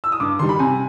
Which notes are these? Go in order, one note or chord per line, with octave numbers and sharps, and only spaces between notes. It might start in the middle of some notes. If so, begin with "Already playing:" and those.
E6
D#6
G2 D6
D#3 G3 C6
B5
C3 G#5